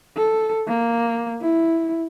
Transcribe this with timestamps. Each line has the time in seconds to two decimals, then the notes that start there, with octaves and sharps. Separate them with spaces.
0.17 A4
0.68 A#3
1.41 E4